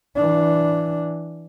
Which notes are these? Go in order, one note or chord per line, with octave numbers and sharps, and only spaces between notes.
E3 D4